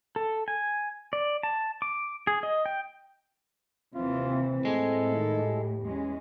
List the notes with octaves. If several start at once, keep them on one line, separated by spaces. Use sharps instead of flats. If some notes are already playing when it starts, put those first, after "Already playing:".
A4
G#5
D5
A5
D6
G#4
D#5
G5
D#2 C3 E3 C4 F4
A2 G#3 A4
D#3
G4
E2 G#3 C#4